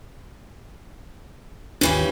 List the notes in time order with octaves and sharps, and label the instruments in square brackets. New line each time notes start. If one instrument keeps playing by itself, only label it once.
[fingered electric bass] G#1 D#2 D4 [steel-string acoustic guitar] C#3 E3 G3